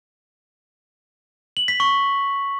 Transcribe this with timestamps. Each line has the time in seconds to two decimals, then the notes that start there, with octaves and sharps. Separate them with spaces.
1.57 F#7
1.68 B6
1.80 C#6